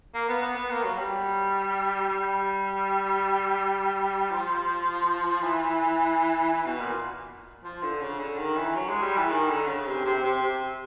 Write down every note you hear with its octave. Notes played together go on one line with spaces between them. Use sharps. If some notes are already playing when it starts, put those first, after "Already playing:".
A#3
B3
B3
B3
A#3
F#3
G3
G3
F3
E3
E3
B2
A#2
F3
D3
C#3
D3
D#3
E3
F#3
G#3
G3
E3
D#3
D3
C#3
C3
C3
C3
C3